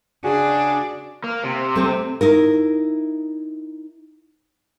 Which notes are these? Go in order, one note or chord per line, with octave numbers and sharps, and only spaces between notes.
C#3 D4 F#4 G#4
A#3
C3
A3 C4
D#4 E4 A#4